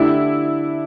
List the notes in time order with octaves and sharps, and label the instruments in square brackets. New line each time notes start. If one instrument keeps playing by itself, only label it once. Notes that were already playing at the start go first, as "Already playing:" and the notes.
Already playing: [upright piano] D3 A3 D4 G4 [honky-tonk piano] E4